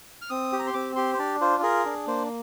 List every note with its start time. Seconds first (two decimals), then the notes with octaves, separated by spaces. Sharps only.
0.21 F6
0.30 C4 D#6
0.52 G4
0.59 A#5
0.67 C6
0.74 C4 D6
0.96 G4 C6
1.14 C5
1.19 D4 D5
1.41 F4 C5
1.63 G#4 A#4
1.85 D4
2.07 A#3 C5